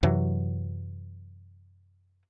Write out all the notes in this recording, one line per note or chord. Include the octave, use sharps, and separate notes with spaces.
F#2 C3 E3 F#3